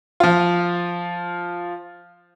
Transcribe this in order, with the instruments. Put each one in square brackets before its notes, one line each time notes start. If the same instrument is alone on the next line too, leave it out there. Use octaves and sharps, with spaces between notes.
[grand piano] F3 F4